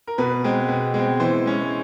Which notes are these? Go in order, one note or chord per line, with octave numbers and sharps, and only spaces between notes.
A#4
B2 B4
G#3 C4
B2
G#3
C4
E3 C5
G#3 C#4